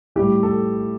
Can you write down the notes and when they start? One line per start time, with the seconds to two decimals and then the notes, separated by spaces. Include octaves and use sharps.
0.16 A2 G3 G4
0.43 A4